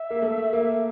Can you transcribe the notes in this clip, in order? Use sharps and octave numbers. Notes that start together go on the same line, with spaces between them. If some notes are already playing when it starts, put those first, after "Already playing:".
Already playing: E5
A#3
A3
A#3